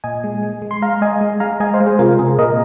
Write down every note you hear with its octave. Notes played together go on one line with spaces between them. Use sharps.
A#2 D#5 G#5
G#3
G#3
G#3
C6
G#3 F5 A#5
G#3 D#5 G#5
G#3
G#3 F5 A#5
G#3 D#5 G#5
C5 F5
G#3
G#4 C5
C3 F4 A#4
C3 G#4
A#2 A#4 D#5